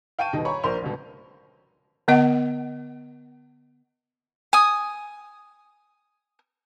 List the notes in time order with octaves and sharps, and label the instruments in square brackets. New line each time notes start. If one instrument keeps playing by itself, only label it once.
[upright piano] F5 G5 A5 C#6 D#7
D#1 B2 D#3 D#5
C#5 G#5 A#5 B5 C#6
A#1 A#4 C5 C6 C#6 F7
G1 C#2 B2
[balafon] D3 B3 D#5 F#5
[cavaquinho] G#5 D#6